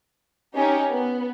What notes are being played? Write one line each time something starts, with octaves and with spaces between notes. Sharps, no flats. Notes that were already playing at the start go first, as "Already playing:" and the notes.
C#4 D#4 G4
B3